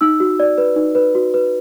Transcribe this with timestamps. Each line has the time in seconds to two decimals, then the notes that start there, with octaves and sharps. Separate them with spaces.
0.01 D#4 E6
0.20 F#4
0.40 D5
0.58 B4
0.76 D#4
0.95 B4
1.15 F#4
1.34 B4